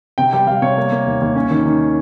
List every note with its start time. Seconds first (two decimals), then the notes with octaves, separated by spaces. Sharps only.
0.18 C3 G5
0.33 G3 G5
0.47 G3 F5
0.62 C3 C#5
0.77 A#3
0.92 A#3
1.07 D#2
1.21 D#2
1.36 C#4
1.51 D#3
1.66 D#3